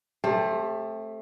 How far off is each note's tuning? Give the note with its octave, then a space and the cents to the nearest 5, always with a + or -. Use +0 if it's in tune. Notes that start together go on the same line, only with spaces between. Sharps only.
A3 +0 C4 +25 G4 +30